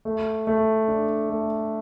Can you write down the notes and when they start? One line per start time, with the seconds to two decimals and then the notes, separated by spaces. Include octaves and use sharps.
0.05 A3
0.47 A3
0.88 D4
1.30 A3